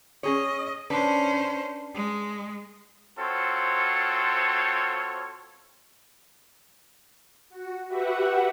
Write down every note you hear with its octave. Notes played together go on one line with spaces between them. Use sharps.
C#4 G#4 C#5 D#5
C#4 D4 B4 C5
G#3
C4 F4 F#4 A4 C5 C#5
F#4
F#4 G4 B4 E5 F#5